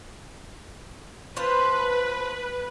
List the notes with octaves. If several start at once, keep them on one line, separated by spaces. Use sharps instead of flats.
F4 B4 C5 A5